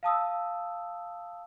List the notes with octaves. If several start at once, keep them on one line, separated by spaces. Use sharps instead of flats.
F5 A5 D#6 E6